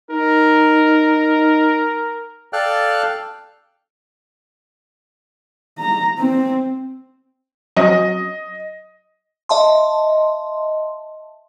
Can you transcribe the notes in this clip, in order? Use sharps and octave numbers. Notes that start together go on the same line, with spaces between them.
D#4 A#4
A4 D5 F5 G5 F6 F#6
A#5
C4
F#3 C4 C#4 D#5
D#5 E5 A5 C6